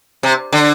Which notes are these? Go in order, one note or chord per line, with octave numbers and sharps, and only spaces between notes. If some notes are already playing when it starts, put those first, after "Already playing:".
C3
D3